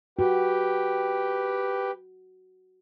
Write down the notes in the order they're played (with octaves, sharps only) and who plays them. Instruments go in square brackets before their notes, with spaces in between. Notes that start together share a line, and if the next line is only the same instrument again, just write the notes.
[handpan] F#4 [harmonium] G4 B4 G5